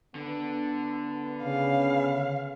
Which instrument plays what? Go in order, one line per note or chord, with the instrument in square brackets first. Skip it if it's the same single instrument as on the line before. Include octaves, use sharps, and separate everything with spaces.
[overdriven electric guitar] D3 [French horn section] B3
[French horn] C#3 [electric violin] F5